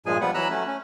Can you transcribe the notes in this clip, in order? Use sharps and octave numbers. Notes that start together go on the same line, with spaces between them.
G2 A#2 F3 G#3 G#4 G#5
F3 G3 B3 B4 F#5
E3 F#3 A#5 B5 E6 F#6
F#3 A3 C#4
C#4